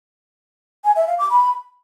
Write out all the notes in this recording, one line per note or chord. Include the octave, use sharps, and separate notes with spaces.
G#5
E5
F5
D6
B5